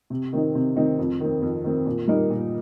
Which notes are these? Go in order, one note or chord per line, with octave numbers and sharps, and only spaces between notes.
C3
D#3 C4 D#4
C3
D#3 C4 D#4
F2
D#3 C4
F2
D#3 C4
A#2
G3 D#4 A#4
A#2